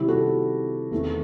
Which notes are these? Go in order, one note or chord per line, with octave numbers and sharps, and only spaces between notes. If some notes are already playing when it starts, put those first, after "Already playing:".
Already playing: C3 D#3 G3 C4 E4 G4
F#4 A4
E2 D#3 A3 C4